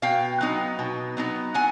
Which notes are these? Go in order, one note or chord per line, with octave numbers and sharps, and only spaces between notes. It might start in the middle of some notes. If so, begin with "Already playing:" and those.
B2 F5 G5
F#3 B3 D#4
B2
F#3 B3 D#4
F#3 F#5 G#5